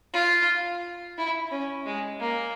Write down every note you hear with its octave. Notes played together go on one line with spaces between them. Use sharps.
F4
E4
C#4
G#3
A#3